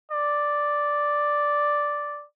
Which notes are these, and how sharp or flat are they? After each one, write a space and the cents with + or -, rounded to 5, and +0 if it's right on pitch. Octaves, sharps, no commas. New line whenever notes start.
D5 +0